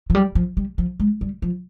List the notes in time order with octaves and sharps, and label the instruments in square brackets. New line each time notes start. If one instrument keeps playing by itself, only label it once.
[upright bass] F3
G3
F3
G3
F3
G#3
G3
F3